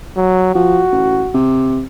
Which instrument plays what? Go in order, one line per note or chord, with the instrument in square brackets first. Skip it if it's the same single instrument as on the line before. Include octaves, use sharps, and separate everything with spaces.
[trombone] F#3
[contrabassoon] F3 [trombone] F#4
[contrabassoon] A1
C3